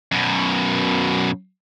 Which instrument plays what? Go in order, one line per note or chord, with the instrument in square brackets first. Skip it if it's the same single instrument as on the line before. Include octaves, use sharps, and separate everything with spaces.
[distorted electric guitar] F#2 B2